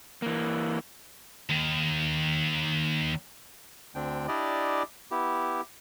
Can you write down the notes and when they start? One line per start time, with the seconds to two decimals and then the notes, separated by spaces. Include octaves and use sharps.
0.22 E3 A#3
1.50 D#2 D#3
3.95 D2 D3 C4 D4 G5
4.28 D4 E4 G4 D5 D#5
5.11 B3 E4 G4